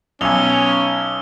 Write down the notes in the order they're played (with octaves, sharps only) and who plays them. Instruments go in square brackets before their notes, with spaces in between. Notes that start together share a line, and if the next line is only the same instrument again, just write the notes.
[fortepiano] B1 G#5 [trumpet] C#4 [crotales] E6 F7 G7